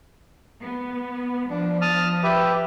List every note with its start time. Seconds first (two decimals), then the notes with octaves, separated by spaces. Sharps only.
0.63 B3
1.50 F3 D4
1.82 A5 D#6 F6
2.23 G4 B4 E5